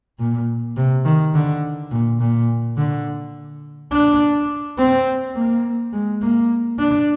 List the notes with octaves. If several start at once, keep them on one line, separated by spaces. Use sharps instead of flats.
A#2
C3
D#3
D3
A#2
A#2
D3
D4
C4
A#3
G#3
A#3
D4